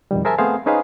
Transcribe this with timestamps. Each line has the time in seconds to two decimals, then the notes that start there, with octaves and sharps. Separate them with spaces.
0.11 F2 B2 D#3 G3
0.25 G#4 A#4 C5 E5 G#5 A5
0.38 A3 B3 C4 G#4 C5 F5
0.66 C#4 D#4 G#4 B4 C5 F5